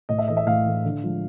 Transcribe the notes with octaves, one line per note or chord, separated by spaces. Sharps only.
A2 D#5
E5
E3 A3 D#5
E5
A2 F5
E3 A3
D3
F3 G#3